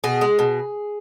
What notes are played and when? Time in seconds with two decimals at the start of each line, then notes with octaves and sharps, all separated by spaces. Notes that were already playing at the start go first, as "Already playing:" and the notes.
0.04 B2 G#4
0.21 G#3
0.39 B2